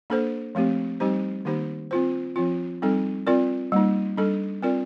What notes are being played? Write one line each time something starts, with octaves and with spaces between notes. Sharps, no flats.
A#3 D4 A4 C5
F3 A3 C4 G4
G3 C4 D#4 G4 C5
D#3 A#3 D#4 G4 C5
C4 F4 C5
F3 C4 F4
G3 C4 D#4 A4
C4 F4 A#4 D5
G3 A#3 D#4
G3 D4 A4
C4 F4 A#4 D5